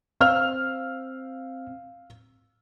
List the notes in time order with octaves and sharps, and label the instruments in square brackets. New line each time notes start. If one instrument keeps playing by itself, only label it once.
[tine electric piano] C4 [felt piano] F5 E6 F6